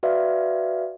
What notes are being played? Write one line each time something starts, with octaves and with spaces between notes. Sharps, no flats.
F#4 B4 D5 E5 F5